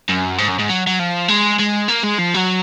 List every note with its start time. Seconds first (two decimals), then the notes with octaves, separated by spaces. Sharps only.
0.09 F#2
0.38 G#2
0.48 F#2
0.59 G#2
0.69 F#3
0.87 F#3
0.99 F3
1.28 G#3
1.60 G#3
1.89 A#3
2.04 G#3
2.19 F3
2.34 F#3